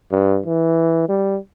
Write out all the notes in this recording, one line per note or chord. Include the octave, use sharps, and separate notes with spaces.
G2
E3
G3